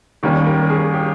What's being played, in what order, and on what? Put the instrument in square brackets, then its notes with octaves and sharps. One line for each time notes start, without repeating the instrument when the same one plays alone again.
[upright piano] D#2 D#3 G3 A#3 C#4 [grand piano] G4
[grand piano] A#4
G#4
G4